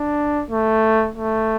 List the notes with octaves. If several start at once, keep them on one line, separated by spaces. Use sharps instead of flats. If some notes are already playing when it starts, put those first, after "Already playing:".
Already playing: D4
A3
A3